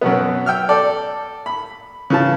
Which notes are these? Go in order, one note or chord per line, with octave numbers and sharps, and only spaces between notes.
F#2 B2 B3
G5 E6 F6
A4 D5
B5
C#3 E3 A5